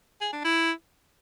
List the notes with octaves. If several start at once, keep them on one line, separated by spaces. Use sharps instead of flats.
G#4
D4
E4